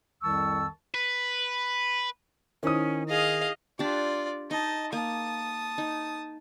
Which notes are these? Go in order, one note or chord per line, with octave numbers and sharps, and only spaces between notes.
C2 F2 D#3 A5 C#6 E6
B4
D#3 C#4 D#4 E4 C5 D#6
G#4 D#5 F5
D4 F4 G4 D5
D#4 D#5 A5
A#3 A5 D#6
D#4